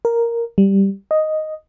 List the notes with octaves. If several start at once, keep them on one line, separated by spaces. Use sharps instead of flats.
A#4
G3
D#5